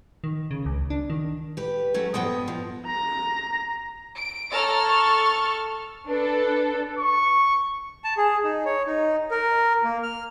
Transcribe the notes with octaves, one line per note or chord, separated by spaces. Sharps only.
D#3
C#3
C#2
D4
D#3
G4 B4
F#3 A3 C#4
G2 F3 B3 D#5 G5
F3
A#5 A#6
D7
A4 C#5 A#5 F6 A6
C#6
D4 A4 B4
C#6
A5
G#4
D#4
C#5
D#4
A#4
A#3
F6